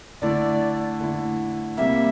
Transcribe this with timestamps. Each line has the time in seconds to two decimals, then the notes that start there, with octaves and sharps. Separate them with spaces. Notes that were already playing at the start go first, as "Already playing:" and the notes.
0.22 D3 A3 E4 D5
1.00 D3 A3 E4
1.77 C3 G3 A#3 E5